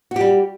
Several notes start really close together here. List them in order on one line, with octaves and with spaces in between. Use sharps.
F#4 G4 G3